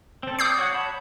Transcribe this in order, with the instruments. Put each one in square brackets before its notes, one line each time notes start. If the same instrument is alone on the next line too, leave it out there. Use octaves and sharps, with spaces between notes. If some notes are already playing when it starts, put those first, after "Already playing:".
[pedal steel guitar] C4 A4
[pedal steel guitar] D5 D6 [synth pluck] D#6 G6 C7
[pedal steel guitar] F#4 C#5 F#5
C#5 A5 B5